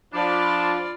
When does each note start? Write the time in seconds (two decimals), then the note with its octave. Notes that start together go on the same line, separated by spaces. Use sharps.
0.13 F3 D4 F4 D5 B5